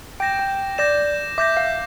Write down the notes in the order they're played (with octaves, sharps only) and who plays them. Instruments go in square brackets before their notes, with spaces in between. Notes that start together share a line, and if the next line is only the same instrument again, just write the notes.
[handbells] G5 [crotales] D6 G6 A#6 E7
[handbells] G5
[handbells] D5 [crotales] D6 G6 A#6 E7
[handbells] E5 [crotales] D6 G6 A#6 E7
[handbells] F5